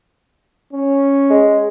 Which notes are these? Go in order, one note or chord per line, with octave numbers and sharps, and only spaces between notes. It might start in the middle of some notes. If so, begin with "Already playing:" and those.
C#4
G#3